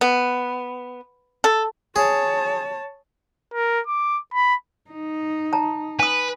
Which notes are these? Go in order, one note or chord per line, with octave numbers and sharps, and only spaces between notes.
B3
A4
G#4 C#5 A5
A#4
D6
B5
D#4
A5 A#5
B4 G#5 D#6